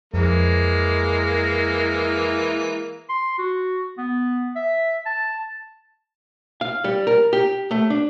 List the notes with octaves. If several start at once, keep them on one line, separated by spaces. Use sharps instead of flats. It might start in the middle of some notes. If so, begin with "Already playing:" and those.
F2 E3 G#3 A#3
C6
F#4
B3
E5
A5
F5
G3
A#4
G4
A3
D4